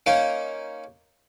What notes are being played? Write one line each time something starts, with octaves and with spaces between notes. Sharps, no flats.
A#3 C#4 D#4 F5 C6